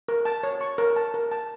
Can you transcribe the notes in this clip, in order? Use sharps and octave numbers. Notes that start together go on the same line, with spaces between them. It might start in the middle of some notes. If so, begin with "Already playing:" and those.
A#4
A5
C#5
C#6
A#4
A5
A#4
A5